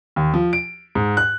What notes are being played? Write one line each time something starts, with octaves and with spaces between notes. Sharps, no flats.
D#2
F3
D7
G#2
F#6